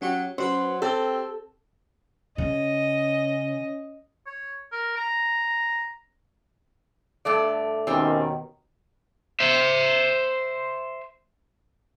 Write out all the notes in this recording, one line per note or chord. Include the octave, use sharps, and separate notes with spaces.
F#3 C#4 G4 C#5
F#3 C#4 F#4 B4 C5
C4 G4 A4
C#3 C#4 D#5
C#5
A#4
A#5
G2 A3 D5
D#2 B2 D#3 G3 C4 C#4
C5 E5